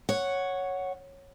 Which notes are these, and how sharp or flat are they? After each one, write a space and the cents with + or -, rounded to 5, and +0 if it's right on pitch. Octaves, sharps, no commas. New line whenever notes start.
C#5 +0 F#5 +0